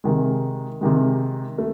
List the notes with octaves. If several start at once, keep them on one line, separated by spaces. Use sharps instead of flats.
C3 D#3 G#3
C3 D#3 G#3
A3